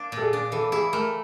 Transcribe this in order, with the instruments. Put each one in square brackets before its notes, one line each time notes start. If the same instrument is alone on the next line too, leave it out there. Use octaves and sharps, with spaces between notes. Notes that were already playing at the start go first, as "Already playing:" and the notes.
Already playing: [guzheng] A#3 D4
A#2
[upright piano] A4
G#4
[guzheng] D4
[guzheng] E3 [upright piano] A4
[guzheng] E4 [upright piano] G#4
[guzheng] A3 [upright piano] A#4